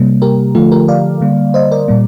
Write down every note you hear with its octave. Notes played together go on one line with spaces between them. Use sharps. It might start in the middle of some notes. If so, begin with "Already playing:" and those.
Already playing: C3 G3 A#3
G4 A#4
D3 F3 A3 F4 A4
G4 A#4
D5 F5
D3 G3 A#3
C5 D#5
A#4 D5
A#2 G3 A#3